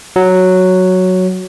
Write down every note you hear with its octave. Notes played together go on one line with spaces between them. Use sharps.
F#3